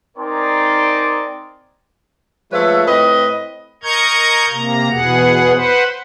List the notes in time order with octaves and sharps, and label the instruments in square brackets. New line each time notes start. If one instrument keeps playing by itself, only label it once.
[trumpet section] C4 D#4 A#4 D5 G#5 C6
[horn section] F3 G#3 A3 B4 C#5 E5
A2 C4 B4 D#5
[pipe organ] A#4 D#5 A#5 C#6 G6 G#6
C3 A#3 A#5
E2 B2 B3 G#4 F#5
B4 C5 F#5